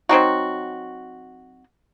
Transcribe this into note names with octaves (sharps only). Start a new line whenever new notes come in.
F#3 C4 D#4 F#4